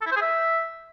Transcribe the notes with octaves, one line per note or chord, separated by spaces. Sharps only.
A4
E4
C5
G#4
E5